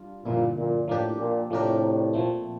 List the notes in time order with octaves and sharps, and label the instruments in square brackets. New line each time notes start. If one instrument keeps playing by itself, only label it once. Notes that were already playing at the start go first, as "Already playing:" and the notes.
Already playing: [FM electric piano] G3 D4 F4
[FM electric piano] G2 D3 F3 A#3 E4 [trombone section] A#2
[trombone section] A#2
[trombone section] A2 [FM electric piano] F3 A#3 D4 G4
[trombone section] A#2
[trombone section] A2 C3 [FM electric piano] F3 A3 D4 G4 A#4
[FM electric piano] A#2 F3 A3 C4